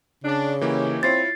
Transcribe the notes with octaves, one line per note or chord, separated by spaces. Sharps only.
C#3 D4
E3 A#3 C#4 D#4 E4 G4
C4 E4 F4 C#5 A6 C7